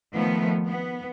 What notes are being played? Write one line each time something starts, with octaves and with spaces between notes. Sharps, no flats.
D#3 F3 A3 B3
B3